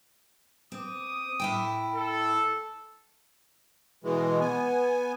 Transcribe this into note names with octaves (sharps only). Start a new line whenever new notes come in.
C4 D6 D#6
A2 E4 G5
A4
B2 E3 G#3
B3 G#5